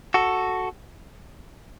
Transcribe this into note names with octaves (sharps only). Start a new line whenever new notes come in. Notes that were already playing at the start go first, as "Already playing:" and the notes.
F#4 A4